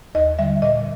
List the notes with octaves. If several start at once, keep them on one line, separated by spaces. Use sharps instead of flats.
D#2 D#5
D3 G3 E5
A#2 D#5